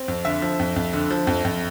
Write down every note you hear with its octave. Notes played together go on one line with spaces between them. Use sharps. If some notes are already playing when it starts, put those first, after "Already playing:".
Already playing: C4
F2
D3 E5
F3
F2
F2
D3
F3
F2
F2